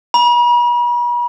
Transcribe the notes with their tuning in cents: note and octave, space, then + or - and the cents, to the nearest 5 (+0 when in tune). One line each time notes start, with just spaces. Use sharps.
B5 -45